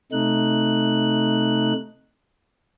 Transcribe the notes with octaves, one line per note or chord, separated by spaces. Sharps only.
C3 A3 D#4 F#6